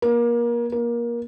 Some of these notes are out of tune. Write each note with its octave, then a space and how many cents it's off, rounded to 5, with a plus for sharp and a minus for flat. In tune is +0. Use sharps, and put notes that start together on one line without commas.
A#3 +30
A#3 +25